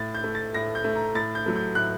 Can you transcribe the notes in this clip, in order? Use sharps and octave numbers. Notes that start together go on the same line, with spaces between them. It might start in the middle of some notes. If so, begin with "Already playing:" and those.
Already playing: A2 A6
G6
A3
A6
A2 A#6
G6
A3
A#5
A2 A6
G6
F#3 A3
G6
A2 F#6